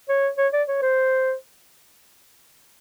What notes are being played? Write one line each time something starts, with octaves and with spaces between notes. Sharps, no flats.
C#5
C#5
D5
C#5
C5